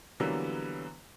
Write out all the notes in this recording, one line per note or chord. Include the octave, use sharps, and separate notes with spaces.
D3 E3 F#3 G3 A#3 B3